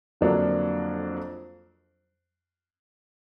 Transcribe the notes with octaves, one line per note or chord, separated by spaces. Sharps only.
F2 D3 F#3 A#3 D4